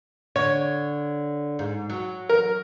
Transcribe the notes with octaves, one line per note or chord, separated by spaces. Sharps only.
D3 C#5
G#2
F#3
A#4